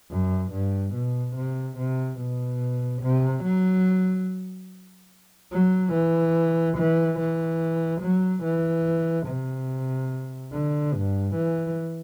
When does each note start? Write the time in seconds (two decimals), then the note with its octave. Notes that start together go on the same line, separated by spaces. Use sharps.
0.11 F#2
0.53 G2
0.94 B2
1.37 C3
1.78 C3
2.20 B2
3.02 C3
3.44 F#3
5.52 F#3
5.93 E3
6.78 E3
7.19 E3
8.02 F#3
8.44 E3
9.27 C3
10.53 D3
10.94 G2
11.35 E3